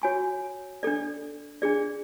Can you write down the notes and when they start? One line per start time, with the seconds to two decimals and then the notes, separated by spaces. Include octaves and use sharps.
0.02 F#4 C#5 G#5 C#6
0.83 D4 A4 D5
1.62 D4 G#4 D5